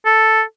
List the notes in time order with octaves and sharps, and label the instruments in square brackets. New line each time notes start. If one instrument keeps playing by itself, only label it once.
[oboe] A4